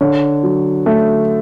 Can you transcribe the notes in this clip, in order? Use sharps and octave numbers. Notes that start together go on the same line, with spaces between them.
D3 C#5
F#3
A3